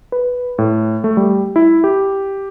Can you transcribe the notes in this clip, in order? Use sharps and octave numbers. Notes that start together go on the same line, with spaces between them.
B4
A2
A3
G3
E4
G4